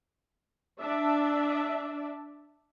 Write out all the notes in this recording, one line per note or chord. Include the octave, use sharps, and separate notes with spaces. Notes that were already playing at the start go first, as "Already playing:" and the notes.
D4 D5 E5